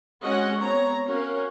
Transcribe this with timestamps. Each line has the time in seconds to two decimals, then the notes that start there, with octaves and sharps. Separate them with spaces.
0.24 G#3 C4 C#4 F#4 D#5 F#5
0.59 B3 C4 C#5 A#5
1.08 C#4 F#4 A#4 F5